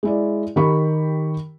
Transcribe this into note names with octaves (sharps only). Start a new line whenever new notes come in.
G#3 E4 D5
D#3 G4 A#4 B5 C#6